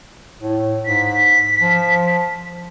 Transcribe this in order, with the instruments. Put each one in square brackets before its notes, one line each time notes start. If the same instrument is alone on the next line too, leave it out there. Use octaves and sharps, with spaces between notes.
[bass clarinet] A2
[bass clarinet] G#2 [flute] B6
[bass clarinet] F3